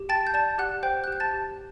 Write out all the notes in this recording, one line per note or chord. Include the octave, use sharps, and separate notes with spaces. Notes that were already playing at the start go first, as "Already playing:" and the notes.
Already playing: G4
G5 A5 A6
G6
D5 A5 A6
G4 F#5 F#6
C5 G5 G6
F#6
G4
G6
A5 A6
G4